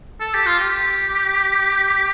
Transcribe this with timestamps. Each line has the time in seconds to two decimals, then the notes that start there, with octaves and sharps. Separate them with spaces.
0.20 A4
0.34 G4
0.46 F4
0.59 G4